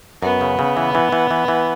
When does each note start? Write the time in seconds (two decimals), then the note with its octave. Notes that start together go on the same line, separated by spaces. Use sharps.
0.23 F#2 B3
0.41 C#3
0.59 C#3
0.77 E3
0.95 E3
1.12 E3
1.31 E3
1.48 E3